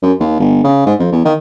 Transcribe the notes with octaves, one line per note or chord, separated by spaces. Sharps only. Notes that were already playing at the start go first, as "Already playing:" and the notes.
F#2
D#2
G1
C#3
G#2
F2
E2
D#3